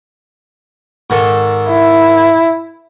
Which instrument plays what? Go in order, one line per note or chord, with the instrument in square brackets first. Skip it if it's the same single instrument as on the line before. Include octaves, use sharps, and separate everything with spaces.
[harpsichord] G#2 D#3 A4
[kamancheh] E4